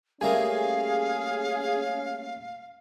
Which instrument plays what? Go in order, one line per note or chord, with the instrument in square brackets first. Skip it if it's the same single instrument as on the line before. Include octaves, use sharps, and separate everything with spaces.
[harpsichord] G3 A3 A#3 [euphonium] C#4 [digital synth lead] G#4 [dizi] F5